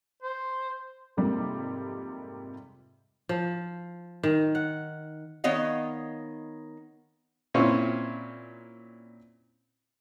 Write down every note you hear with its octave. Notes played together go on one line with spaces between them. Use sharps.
C5
F2 G#2 C3 G3 A#3
F3
D#3
F#5
D#3 B3 C#5 D#5 F5
A#2 C4 C#4 E4